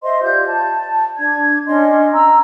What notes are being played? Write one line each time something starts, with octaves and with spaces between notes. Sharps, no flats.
C5 D#5 E5 C6
F4 G4 D5 G6
A5
D4 G#6
C#4 D4 D#5 C6
A#5 E6